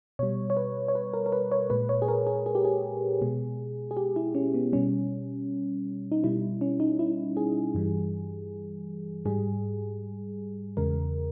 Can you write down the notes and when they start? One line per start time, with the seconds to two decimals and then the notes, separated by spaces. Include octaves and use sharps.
0.19 B2 G3 C#5
0.50 C#5
0.57 B4
0.88 C#5
0.95 B4
1.13 A#4
1.26 A#4
1.32 B4
1.52 C#5
1.70 A#2 G#3 B4
1.89 C#5
2.02 G#4
2.08 A#4
2.27 G#4
2.46 G#4
2.55 G4
2.64 G#4
3.21 B2 G#3
3.91 G#4
3.97 G4
4.16 E4
4.35 C#4
4.54 B3
4.72 B2 G3 C#4
6.12 D#4
6.24 B2 G3 E4
6.61 C#4
6.80 D#4
6.99 E4
7.37 G#4
7.75 G2 E3 G3
9.25 G#2 G3 G#4
10.77 E2 C#3 G#3 A#4